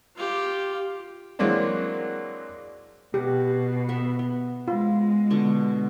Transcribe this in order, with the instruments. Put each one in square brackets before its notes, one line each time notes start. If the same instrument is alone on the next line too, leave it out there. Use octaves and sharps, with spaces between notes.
[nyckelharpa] F4 G4
[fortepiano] E3 F#3 G#3 A#3 C4 D4
[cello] B2 [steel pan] G4 [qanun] F#5
[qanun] B3 E5 F#5
B3
[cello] G#3 [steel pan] F4
[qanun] B2 D3 C#6